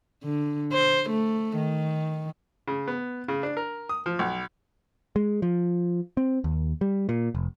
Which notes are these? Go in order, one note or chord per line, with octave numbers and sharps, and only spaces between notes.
D3
C5
A3
D#3
C#3
B3
C#3
D4
A#4
D#6
F3
B1
G#3
F3
C4
D#2
G3
A#2
F1